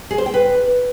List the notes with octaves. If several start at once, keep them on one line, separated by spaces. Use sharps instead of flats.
G#4
C5
G5
B4